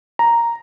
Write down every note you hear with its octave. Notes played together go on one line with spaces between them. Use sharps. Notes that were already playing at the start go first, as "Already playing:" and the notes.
A#5